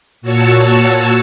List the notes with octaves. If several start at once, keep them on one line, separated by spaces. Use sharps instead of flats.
A#2 F#4 C#5 A5 E6 C#7